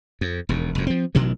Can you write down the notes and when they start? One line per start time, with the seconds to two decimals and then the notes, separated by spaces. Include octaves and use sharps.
0.21 F2
0.49 E1 D#2
0.75 F1 F2
0.87 F3 C4
1.15 A1 B2 D#3 F#3